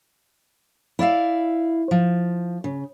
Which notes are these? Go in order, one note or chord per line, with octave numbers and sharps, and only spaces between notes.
E4 D5 E5 F5
F3
C#3